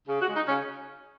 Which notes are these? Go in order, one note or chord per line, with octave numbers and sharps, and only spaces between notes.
C#3
F#4
G#3
D#4
C#3 C#4